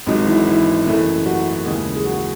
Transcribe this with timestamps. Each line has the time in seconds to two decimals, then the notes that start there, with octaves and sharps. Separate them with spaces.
0.07 G#1 G#2 F#3 D#4
0.27 E3 E4
0.47 E3 E4
0.86 F#1 F#2 E3 A3
1.26 F#3 F#4
1.65 D#2 C#3 E3 G#3 G#4
1.96 G#4
2.05 F#3 F#4